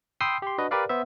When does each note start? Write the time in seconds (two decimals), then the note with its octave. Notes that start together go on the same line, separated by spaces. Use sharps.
0.21 G5 B5 C6 D#6 E6 C7
0.42 G4 C6
0.58 D4 F#4 B4 D#5
0.71 G4 A#4 B4 D5 F5
0.89 B3 C5 E5